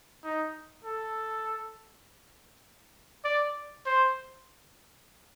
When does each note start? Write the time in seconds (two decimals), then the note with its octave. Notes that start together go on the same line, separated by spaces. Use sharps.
0.24 D#4
0.84 A4
3.24 D5
3.86 C5